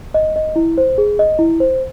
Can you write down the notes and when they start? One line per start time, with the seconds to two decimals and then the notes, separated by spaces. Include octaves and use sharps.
0.14 D#5
0.36 D#5
0.56 E4
0.78 C5
0.98 G#4
1.19 D#5
1.39 E4
1.60 C5